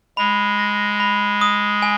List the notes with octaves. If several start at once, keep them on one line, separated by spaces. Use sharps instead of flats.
G#3 B5
A#6
B5
D#6
G#5